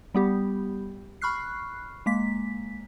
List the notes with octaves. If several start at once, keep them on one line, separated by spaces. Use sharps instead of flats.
G3 B3 G4
B5 C#6 F6 F#6 C7
G#3 A#3 B6